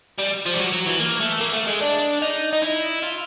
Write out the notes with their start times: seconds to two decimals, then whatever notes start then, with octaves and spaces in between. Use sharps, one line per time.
0.18 G3
0.45 F3
0.54 G3
0.59 F#3
0.72 F#3
0.87 E3
0.99 A#3
1.20 A3
1.41 A#3
1.53 A3
1.67 G#3
1.81 D4
2.22 D#4
2.53 D#4
2.62 E4
3.03 F4